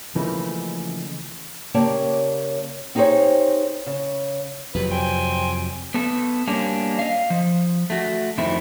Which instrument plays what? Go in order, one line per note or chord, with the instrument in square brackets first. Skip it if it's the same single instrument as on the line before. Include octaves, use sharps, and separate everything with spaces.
[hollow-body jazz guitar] C#3 E3 F3 A3 A#3 D#4
[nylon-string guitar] C#3 A#3 G4 C#5 D5 A5
C4 D#4 G4 G#4 C5 C#5
C#3
[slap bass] F2 C3 F#3 [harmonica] B4
[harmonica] C5 G5 G#5
[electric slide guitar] B3 A4
G3 A#3 C#4 D4
D#5 F5
F3
A3 F#4
F2 C3 D#3 A3 C4 E4